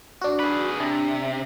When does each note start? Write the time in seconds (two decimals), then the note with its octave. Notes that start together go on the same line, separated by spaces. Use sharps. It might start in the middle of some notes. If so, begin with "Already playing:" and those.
0.21 D4 F#4
0.39 G#4 B4
0.80 C3 D4